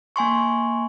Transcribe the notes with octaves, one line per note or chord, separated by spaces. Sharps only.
A#3 G#5 C6 C#6